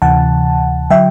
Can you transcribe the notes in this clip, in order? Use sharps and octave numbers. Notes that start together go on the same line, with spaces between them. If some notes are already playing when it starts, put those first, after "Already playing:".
D2 C3 E3 F#5 A5
D3 F#3 E5 G5